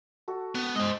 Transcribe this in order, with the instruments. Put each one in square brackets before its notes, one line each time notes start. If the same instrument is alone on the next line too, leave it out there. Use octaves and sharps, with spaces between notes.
[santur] F#4 A4
[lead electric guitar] B3
[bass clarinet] G#3 [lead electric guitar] C5 D#5